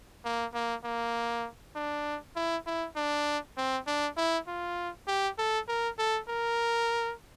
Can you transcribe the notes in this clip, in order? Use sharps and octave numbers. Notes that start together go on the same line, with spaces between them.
A#3
A#3
A#3
D4
E4
E4
D4
C4
D4
E4
F4
G4
A4
A#4
A4
A#4